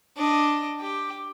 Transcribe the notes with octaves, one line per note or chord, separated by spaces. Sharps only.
D4 D#5
G4